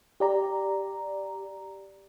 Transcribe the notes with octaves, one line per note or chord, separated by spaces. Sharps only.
G4 D5 A#5